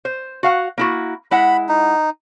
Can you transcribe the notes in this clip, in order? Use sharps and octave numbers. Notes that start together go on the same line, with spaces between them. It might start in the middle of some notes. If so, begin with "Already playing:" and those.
C5
F#4 F5 F#5
A#3 E4 F#4
G#3 E4 F#5 B5
D#4